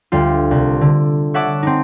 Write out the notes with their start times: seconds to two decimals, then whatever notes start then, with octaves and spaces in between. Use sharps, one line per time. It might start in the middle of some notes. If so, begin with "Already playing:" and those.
0.12 D2 G3 F4
0.51 C2
0.81 D3
1.34 C#5 E5 F#5 A5 D6
1.63 C4 D#4